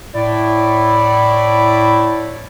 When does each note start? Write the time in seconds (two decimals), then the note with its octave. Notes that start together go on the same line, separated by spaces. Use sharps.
0.14 A2 E4 D5